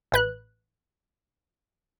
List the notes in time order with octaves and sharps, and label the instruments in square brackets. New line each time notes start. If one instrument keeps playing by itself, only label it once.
[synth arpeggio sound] A1 B4 F#6